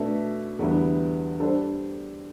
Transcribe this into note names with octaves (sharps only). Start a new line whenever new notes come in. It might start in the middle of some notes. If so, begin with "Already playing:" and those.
Already playing: B2 A3 D4 A4 E5
E2 D3 G3 B3 E4
G3 D4 A4 C5